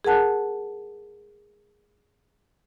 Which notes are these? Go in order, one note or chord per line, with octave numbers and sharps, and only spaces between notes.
G#4 A#4 F#5 A5 F#6